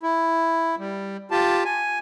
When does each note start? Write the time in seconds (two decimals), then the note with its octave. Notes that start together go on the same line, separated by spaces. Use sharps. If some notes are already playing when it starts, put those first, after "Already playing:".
0.03 E4
0.79 G3
1.31 F4 G4 A5
1.65 G#5